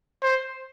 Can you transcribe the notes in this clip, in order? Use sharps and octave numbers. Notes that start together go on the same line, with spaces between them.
C5